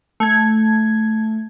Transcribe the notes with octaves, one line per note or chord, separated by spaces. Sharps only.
A3 G#6